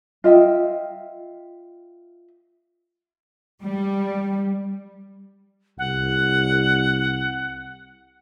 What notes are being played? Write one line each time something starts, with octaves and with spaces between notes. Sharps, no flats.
F4 D#5 E5 G5
G3
C2 F#5